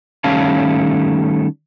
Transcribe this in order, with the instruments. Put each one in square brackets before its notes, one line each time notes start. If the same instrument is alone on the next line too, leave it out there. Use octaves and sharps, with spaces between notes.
[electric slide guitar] D#3 G3 A3 C#4 F5 A5